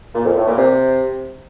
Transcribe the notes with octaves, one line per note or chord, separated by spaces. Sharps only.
A#2
F2
A2
A#2
C3